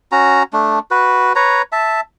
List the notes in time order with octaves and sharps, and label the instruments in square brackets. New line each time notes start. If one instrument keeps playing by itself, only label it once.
[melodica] C#4 F#4 A#5
A3 D4
F#4 B4
B4 C#5 A#5
E5 A5